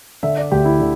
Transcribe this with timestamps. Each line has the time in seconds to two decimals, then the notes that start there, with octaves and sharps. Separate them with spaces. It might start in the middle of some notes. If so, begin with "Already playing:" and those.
0.23 D3 E5
0.38 D5
0.52 D2 G4
0.65 E4
0.80 D3